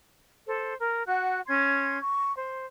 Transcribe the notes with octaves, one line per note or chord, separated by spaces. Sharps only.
A4 C5
A#4
F#4 F#5 F#6
C#4 C6 G#6
C#6
C5